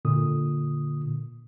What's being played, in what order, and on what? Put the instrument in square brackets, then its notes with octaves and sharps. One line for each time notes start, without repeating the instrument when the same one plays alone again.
[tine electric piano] A#2 D3 D#6